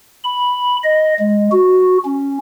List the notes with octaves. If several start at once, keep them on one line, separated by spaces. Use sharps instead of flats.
B5
D#5
G#3
F#4
C#4